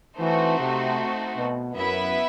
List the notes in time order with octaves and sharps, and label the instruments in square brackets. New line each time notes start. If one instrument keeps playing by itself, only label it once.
[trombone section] E3 [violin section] A3 C4 D#4 F#4 C5
[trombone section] C3
B2
[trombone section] F#2 [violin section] B3 E4 B4 E5